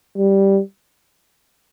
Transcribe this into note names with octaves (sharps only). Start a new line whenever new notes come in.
G3